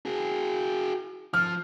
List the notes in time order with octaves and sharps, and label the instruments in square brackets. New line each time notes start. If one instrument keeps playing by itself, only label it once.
[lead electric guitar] F#4 G#4
[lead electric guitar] F3 [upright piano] F6